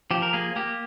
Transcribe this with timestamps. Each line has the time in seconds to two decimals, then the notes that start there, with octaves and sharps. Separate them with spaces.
0.11 F3 G4
0.22 A#4
0.33 A#3 G#4
0.56 A#3 G4